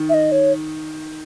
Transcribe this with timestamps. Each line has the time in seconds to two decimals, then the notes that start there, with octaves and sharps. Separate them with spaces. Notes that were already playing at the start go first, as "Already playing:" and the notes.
Already playing: D#3
0.09 E5
0.14 D#5
0.32 C#5